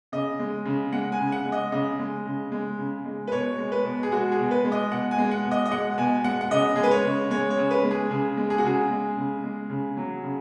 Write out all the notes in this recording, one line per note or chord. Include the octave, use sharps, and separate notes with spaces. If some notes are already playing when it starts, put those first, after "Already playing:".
C#3 D#5
G#3
C#3
G#3 F#5
G#5
C#3
F#5
G#3
D#5
C#3 D#5
G#3
C#3
G#3
C#3
G#3
B4
B2 C#5
G#3
B4
B2
G#4
G#3 F#4
G#4
B2
B4
G#3
D#5
B2 F#5
G#5
G#3
F#5
B2
D#5
D#5
G#3 F#5
B2 G#5
G#3 F#5
F#5
C#3 D#5
G#3 G#4
B4
C#5
C#3
G#3 C#5
C#5
C#3
B4
G#3
G#4
C#3 G#4
G#3
G#4
F#4
C#3 G#4
G#3
C#3
G#3
C#3
F#3
C#3